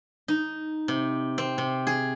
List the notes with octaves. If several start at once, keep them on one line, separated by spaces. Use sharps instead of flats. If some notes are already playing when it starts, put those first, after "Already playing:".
D#4
C3
C4
C3
G#4